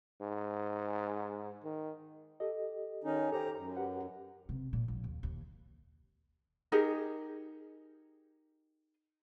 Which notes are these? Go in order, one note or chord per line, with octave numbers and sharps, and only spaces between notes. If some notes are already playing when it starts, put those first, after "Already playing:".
G#2
D#3
G4 A4 D#5
D#3 C#4 D#4
G4 A4 C5 G#5 A#5
F#2 A#5
G4 B4 F#5
C3
A#2
A#1
D#2
D#2
D#4 G4 G#4 A#4